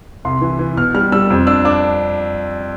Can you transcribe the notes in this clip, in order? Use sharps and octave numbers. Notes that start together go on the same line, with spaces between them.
C2 C6
E3
E3
B2 F6
G3 F6
G3 E6
F2
D4 E6
D4 D6